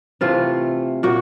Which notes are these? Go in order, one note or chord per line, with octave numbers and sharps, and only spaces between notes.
C3 E3 A3 F4
A#2 F#4